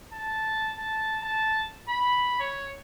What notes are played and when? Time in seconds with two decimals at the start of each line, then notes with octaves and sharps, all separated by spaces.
0.13 A5
0.78 A5
1.23 A5
1.89 B5
2.40 C#5